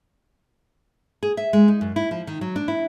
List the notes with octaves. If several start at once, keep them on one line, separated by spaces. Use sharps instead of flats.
G#4
E5
G#3
D#4
F#2
E4
F3
D#3
F#3
D4
E4